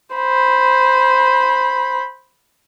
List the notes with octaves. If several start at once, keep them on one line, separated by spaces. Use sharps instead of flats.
C5 B5